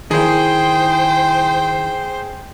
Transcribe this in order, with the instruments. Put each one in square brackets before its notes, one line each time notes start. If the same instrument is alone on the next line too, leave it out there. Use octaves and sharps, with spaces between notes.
[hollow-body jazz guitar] D#3 E4 [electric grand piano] G#4 [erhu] C5 [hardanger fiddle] G5